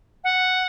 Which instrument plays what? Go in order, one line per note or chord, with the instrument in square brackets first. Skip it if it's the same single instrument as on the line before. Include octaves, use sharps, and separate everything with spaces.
[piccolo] F#5